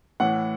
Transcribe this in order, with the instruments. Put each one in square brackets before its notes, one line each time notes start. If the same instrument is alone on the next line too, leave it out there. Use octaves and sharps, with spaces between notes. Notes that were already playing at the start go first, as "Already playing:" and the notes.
[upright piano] A2 E3 F#5